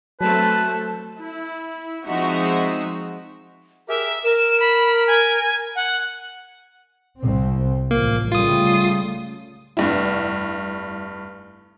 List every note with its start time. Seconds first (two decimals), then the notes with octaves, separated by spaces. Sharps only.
0.21 F#3 A3 C4 B4 A5
1.19 E4
2.05 F3 G#3 C4 D#4 F#4 E5
3.89 G4 G#4 A#4 E5
4.25 A#4 E7
4.60 B5
5.07 G#5
5.75 F#5
7.19 C2 C4
7.91 A1 F3 A#3
8.32 C#3 G3 A3 F4 D#6
9.77 F1 G2 E4